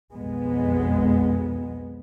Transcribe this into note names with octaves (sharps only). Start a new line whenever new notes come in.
B1 F2 G#3 B3